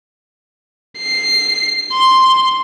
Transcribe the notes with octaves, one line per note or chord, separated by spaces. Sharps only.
C7
C6